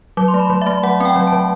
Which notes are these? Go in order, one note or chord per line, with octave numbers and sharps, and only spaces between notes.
F#3 D6
C6
A3
B5
F#3
A3 E5
F#3 F#5
C4 G5
F#3
A5
F#3